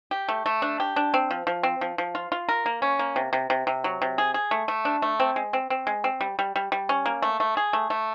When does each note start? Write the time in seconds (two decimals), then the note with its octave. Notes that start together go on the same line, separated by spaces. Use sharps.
0.11 G4
0.29 A3
0.46 A3
0.62 D4
0.80 G4
0.96 D4
1.14 C4
1.31 F3
1.47 F3
1.63 C4
1.81 F3
1.98 F3
2.15 F4
2.32 F4
2.49 A#4
2.66 A#3
2.82 C#4
2.99 A#3
3.16 C3
3.33 C3
3.50 C3
3.67 C3
3.84 F#3
4.02 C3
4.18 G#4
4.34 G#4
4.51 A3
4.68 A3
4.85 D4
5.02 A3
5.20 C4
5.36 G#3
5.53 C4
5.70 C4
5.87 G#3
6.04 C4
6.21 G3
6.39 G3
6.56 G3
6.72 G3
6.89 C#4
7.06 A#3
7.22 A3
7.40 A3
7.57 G#4
7.73 A3
7.90 A3